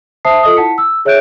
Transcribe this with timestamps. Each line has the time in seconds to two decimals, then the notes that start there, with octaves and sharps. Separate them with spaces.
0.25 C5 E5 A5 D#6 C7
0.43 F4 A4 D#5 D#6
0.56 E4 F#5 A5 B6 C#7
0.78 E6
1.05 G#4 C#5 E5 F#6 G6 D7